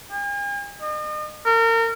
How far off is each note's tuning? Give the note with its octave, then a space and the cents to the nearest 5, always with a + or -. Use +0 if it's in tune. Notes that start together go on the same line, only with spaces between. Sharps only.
G#5 -45
D#5 -40
A#4 -35